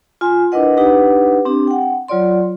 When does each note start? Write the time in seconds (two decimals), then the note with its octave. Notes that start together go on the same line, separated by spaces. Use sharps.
0.21 F4 G#5 C6
0.52 D4 E4 A#4 B4 D#5 F#5
0.77 D4 D#4 G4 B4 F#5
1.45 C4 D4 G4
1.67 F#5 G5
2.08 F#3 F4 C#5 D5 C6